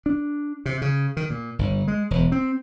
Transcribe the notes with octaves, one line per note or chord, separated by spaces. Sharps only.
D4
C3
C#3
D#3
A#2
G1
G#3
E1
C4